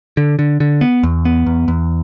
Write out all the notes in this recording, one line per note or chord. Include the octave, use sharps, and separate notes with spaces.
D3
D3
D3
B3
E2
B3
E2
E2